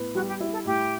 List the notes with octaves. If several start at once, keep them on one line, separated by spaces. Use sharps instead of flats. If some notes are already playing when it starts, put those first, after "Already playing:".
Already playing: A2 B3
G3 F#4
G4
E4
A4
A2 G4